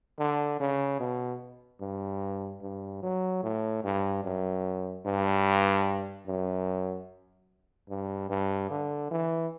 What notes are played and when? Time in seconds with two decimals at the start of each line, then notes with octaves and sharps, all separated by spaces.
0.19 D3
0.60 C#3
1.00 B2
1.81 G2
2.62 G2
3.03 F#3
3.43 A2
3.84 G2
4.24 F#2
5.06 G2
6.27 F#2
7.89 G2
8.30 G2
8.70 D3
9.11 E3